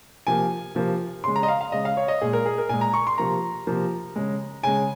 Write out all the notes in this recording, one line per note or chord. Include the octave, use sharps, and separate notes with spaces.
C3 F3 A#3 G#5
C3 F3 A#3
C#3 G#3 C6
A#5
D#5
F5
F5
C#3 G#3 D#5
F5
C#5
D#5
A#2 G#3 G#4
A#4
G#4
A#4
A#2 G#3 G#5
A#5
C#6
C6
C3 F3 A#3 A#5
C3 F3 A#3
C#3 G#3
C#3 G#3 G#5